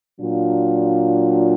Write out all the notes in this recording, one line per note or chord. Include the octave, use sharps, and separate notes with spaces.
A#2 F#3 D4 F4